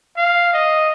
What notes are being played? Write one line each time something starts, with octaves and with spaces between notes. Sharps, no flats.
F5
D#5